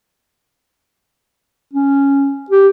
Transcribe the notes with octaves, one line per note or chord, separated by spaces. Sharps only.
C#4
G4